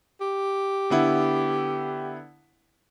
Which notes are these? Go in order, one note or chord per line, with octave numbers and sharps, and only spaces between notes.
G4
D3 B3 E4